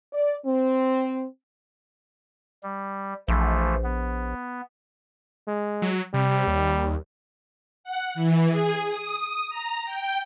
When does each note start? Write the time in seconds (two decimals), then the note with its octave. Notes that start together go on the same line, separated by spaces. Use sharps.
0.13 D5
0.45 C4
2.63 G3
3.28 A#1 E3 F3 A3
3.84 B3
5.48 G#3
5.82 F#3
6.14 C3 G3
6.47 D#2
7.84 F#5
8.14 E3
8.48 G#4
8.87 D#6
9.49 A#5
9.85 G5